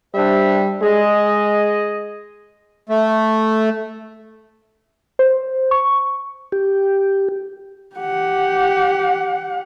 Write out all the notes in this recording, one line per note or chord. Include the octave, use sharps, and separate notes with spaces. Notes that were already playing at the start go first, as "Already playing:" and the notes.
G3 D4 C5 E5
G#3 G#4 D#5
A3
C5
C#6
G4
G4 F#5